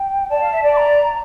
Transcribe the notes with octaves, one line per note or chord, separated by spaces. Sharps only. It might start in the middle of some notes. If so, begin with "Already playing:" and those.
Already playing: G5
D5 A5
F5
E5
D5
D6
A#5